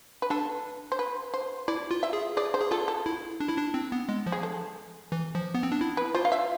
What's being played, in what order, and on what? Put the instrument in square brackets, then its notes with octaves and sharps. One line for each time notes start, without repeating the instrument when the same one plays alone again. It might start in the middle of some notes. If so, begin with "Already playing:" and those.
[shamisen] B4
[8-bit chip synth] D4 [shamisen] A4
[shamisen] C5
B4
C5
[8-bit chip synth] E4 [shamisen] D5
[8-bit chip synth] F4
[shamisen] E5
[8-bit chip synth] G#4
[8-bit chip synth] G#4 [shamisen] D5
[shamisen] C5
[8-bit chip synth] G#4
[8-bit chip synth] F4 [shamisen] A4
[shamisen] A4
[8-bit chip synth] E4
D4
E4
D4
C4
B3
G#3
F3
[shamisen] G#4
A4
[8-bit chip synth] E3
F3
B3
C4
D4
E4
[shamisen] B4
[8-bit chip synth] F4 [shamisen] C5
[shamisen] F5
E5